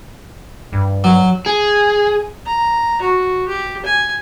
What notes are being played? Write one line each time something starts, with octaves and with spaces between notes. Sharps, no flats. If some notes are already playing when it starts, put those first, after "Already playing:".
G2
F#3
G#4
A#5
F#4
G4
G#5